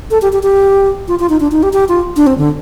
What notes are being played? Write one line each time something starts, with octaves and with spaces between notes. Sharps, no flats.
A4
G4
G4
G4
F4
F4
D#4
D4
D#4
G4
G4
F4
D4
C4
D3